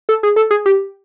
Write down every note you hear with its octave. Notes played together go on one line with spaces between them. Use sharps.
A4
G#4
A4
G#4
G4